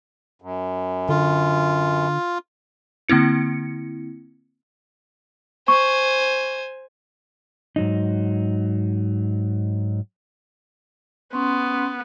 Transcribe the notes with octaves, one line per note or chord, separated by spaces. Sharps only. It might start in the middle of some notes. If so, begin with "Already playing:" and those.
F#2
D3 F4
D3 A#3 C4 E4 C#7
C5 G#5 C#6
G#2 F#3 D#4
B3 C#4 C6